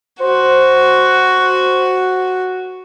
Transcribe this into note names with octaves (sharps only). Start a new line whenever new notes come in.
F#4 C5